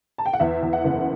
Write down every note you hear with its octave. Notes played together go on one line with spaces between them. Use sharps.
A5
G5
F#5
E2 E5
E2
F#5
F#1